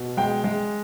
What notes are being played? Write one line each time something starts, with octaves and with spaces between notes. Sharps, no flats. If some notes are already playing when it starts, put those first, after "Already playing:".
Already playing: B2
G#3 G5
G#3